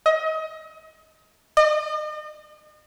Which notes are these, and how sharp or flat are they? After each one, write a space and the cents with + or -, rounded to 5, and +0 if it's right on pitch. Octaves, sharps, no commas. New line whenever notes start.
D#5 +30
D#5 -40